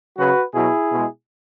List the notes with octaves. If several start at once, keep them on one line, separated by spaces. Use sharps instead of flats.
C#3 F#3 F#4 B4
B2 F#3 E4 G#4
B2
G#3